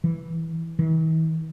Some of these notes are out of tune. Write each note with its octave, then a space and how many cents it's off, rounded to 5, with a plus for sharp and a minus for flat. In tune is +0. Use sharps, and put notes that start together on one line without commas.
E3 -10
E3 -45